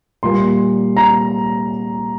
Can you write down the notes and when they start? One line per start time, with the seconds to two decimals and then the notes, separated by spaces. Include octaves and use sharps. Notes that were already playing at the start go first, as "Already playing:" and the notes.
0.23 A#2 G3 A#3 C6
0.97 A#5